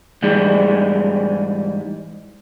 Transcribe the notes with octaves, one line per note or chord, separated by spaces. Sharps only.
G#2 E3 G3 G#3